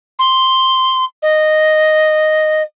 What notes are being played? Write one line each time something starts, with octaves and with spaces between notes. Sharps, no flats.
C6
D#5